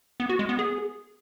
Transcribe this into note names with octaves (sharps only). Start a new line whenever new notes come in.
B3
F#4
G#3
B3
G#4